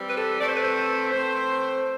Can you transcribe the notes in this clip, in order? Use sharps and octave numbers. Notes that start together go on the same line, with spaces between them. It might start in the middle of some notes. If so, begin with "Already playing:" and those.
Already playing: E3 G3 C4
B4
A4
E3 A3 C4 D5
C5
B4
C5
E3 A3 C4 C5